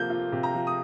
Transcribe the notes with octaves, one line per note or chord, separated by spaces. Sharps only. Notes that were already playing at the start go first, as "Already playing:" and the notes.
Already playing: C3 F3 A#3 G6
F4
C3
A#5
F3
D#6